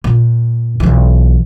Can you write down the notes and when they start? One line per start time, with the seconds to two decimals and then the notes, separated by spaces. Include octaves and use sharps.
0.04 A#2
0.80 B1 E3